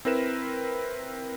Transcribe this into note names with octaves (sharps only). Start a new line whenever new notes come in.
C4 E4 A#4 B4 E7